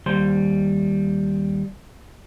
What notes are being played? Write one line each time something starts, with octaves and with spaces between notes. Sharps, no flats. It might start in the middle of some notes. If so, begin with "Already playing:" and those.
D#2 G3 C5 C6